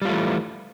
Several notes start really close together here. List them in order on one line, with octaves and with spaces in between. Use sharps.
G3 F4 A3 E3